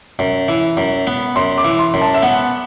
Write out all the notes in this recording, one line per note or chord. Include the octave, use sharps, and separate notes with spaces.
F#2
E3
F#2
B3
F#2 C6
D6
E3
C6
F#2
A5
E5
B3 F#5